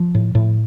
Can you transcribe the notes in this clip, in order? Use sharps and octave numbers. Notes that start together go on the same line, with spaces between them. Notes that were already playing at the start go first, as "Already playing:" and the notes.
Already playing: F3
A2
A2